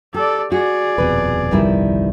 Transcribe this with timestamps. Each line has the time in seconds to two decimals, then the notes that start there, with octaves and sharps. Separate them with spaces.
0.14 G4 A4 D5
0.52 F#4 G#4 D5
0.98 D#1 F2 B2 B4
1.51 G1 C2 F2 D#3 G3 E4